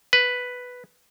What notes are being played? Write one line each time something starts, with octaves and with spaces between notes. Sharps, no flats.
B4